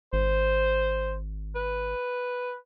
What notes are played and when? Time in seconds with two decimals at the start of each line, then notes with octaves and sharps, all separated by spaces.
0.13 G#1 C5
1.56 B4